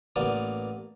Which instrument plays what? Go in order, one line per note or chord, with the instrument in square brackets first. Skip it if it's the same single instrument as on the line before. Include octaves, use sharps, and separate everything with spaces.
[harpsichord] A1 A#3 B3 D5 D#6